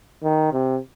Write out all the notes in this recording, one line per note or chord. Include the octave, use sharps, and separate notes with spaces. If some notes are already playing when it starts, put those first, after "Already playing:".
D#3
C3